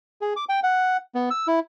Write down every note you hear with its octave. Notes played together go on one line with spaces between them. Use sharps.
G#4
D6
G5
F#5
B3
E6
E4